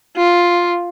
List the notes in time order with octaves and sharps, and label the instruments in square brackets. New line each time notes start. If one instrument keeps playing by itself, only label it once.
[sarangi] F4